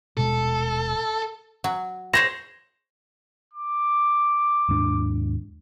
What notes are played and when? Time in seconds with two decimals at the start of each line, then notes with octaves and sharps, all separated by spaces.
0.17 D#1 B2 G#3 A4
1.64 F#3
2.13 G#4 C5 C#5 A#6 E7
3.54 D6
4.69 D#2 G#2 D4